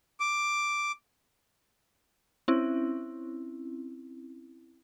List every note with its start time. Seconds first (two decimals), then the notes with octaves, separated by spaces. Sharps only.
0.20 D6
2.48 C4 C#4 E4